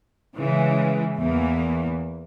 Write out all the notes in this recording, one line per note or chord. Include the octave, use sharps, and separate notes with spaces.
C#3 E3 G#3
E2 E3 A#3